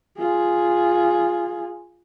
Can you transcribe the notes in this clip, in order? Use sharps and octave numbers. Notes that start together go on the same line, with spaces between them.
F4 G#4